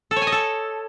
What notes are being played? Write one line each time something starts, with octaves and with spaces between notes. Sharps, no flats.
A4
C#5
G#5
D#5
A4